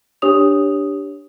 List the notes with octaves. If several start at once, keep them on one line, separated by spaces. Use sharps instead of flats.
D4 G4 C#5 D#6 F7